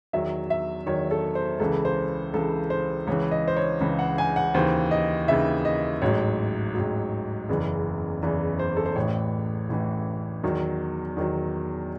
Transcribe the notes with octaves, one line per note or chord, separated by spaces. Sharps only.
E2 D#3 F#3 E5
E5
E2 D#3 F#3 C#5
A4
C5
C#2 C#3 E3 A4
C5
C#2 C#3 E3 A4
C5
C#2 C#3 E3 C#5
D#5
C5
C#5
C#2 C#3 E3
F#5
G#5
F#5
D#2 C#3 E3 C5
D#5
D#2 C#3 E3 E5
D#5
A1 G#2 F#3 C#5
A1 G#2 F#3
F#1 E2 C#3 E3
F#1 E2 C#3 E3
C5
A4
C5
A1 A2 E3 C#5
A1 A2 E3
E2 D#3 F#3
E2 D#3 F#3